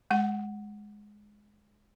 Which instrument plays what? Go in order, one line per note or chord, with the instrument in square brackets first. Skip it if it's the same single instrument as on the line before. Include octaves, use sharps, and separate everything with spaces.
[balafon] G#3 F#5